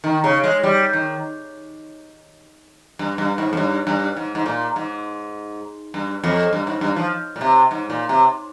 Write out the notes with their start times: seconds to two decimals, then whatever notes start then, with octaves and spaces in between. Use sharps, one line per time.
0.04 D#3
0.24 C#3
0.43 G#3
0.63 G3
0.93 D#3
2.99 G2
3.18 G2
3.38 G#2
3.53 F2
3.57 G2
3.87 G2
4.17 G#2
4.35 G#2
4.46 A#2
4.76 G#2
5.94 G2
6.24 F2
6.53 G2
6.67 G#2
6.81 G2
6.96 F3
7.36 A#2
7.41 C3
7.71 G#2
7.90 A#2
8.09 C3